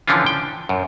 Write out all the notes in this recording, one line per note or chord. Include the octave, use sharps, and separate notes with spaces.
D3 E3 F3 C#4 D4 F4
G5
F#2